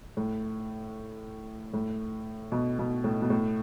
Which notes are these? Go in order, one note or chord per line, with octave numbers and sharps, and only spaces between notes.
A2
A2
B2
B2
A2
B2
A2